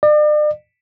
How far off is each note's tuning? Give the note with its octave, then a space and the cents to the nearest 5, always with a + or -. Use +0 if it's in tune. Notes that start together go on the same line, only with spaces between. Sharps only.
D5 +40